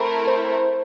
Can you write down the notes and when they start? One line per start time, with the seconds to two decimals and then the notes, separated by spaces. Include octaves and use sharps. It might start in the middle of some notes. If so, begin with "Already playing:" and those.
Already playing: A3 C4 E4 A#4
0.27 C5